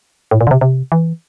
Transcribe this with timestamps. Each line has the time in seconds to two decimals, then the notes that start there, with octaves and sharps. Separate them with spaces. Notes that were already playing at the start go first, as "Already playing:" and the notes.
0.31 A2
0.41 A#2
0.47 D3
0.51 C3
0.61 C3
0.92 E3